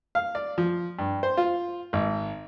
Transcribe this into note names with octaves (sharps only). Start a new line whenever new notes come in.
F5
D5
F3
G2
C5
F4
G#1